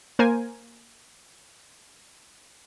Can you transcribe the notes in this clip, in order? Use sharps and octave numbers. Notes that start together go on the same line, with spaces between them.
A#3 A#4 C5 G#5